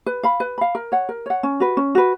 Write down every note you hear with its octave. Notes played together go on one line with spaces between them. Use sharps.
B4
F5 B5
B4
F5 B5
A#4
C#5 F#5
A#4
C#5 F#5
C#4
F#4 B4
C#4
F#4 B4